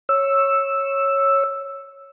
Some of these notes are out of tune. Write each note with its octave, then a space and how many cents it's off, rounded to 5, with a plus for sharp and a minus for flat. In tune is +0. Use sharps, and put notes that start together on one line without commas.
C#5 -10 E6 +0